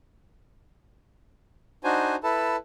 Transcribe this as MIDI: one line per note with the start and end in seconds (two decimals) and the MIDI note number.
1.84 2.15 62
1.84 2.15 63
1.84 2.15 66
1.84 2.15 72
1.84 2.15 80
2.24 2.56 64
2.24 2.56 69
2.24 2.56 71
2.24 2.56 81